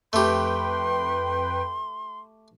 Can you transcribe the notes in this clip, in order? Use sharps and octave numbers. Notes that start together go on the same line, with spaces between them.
F2 A3 G4 B4 G5 C6